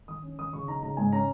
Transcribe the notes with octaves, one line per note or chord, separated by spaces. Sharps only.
D#3 D#6
C#4
D#3 D#6
C#3 C#6
D#4 A#5
C#3 A#5
G#2 G#5
C#4 A#5